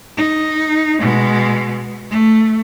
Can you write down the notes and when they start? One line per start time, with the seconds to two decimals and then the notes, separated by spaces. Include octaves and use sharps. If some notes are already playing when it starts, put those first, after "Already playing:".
0.17 D#4
0.99 B2 G#3
2.10 A3